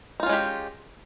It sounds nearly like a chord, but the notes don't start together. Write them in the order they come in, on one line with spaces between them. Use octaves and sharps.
D#4 F4 C#4 G#3 G4